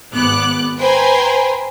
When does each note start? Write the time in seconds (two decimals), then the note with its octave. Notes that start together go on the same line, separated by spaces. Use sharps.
0.11 G#1 B3 D6 F#6
0.79 B4 C5 G5 G#5 A#5 C6